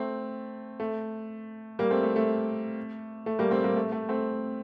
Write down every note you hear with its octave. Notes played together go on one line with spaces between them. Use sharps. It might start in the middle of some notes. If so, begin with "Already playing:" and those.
Already playing: A3 C4
A3
G3 A#3
A3 C4
A3
A3
A3
G3 A#3
A3 C4
G3 A#3
A3
A3
A3 C4